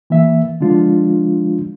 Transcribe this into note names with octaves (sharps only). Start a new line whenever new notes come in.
E3 A#3 E5
D3 F3 G#3 D4 F4